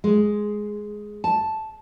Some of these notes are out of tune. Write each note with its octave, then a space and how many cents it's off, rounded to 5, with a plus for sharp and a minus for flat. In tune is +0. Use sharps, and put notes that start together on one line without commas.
G#3 +5
A5 -5